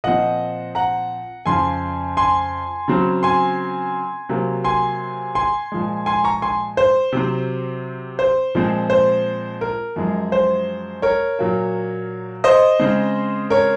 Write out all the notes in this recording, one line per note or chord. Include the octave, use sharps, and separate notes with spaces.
A#2 F3 C4 D#5 F#5
F#5 A#5
F2 C#3 F3 G#5 C6
G#5 C6
C#3 F#3 C4
G#5 C6
C3 F#3 A#3
G#5 C6
G#5 C6
A#2 F3 G#3
G#5 C6
A#5 C#6
G#5 C6
C5
C3 F#3 C4
C5
A#2 F3 G#3 C4
C5
A#4
F#2 F3 G#3
C5
A#4 C#5
A#2 F#3 A#3
C5 D#5
C#3 G#3 C4
A#4 C#5